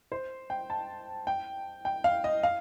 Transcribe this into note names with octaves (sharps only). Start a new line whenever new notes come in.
C5
G5
A5
G5
G5
F5
D#5
F5